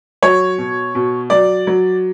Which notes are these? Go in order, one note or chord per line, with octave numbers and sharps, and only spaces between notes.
F#3 C#5
B2
B2
F#3 D5
F#3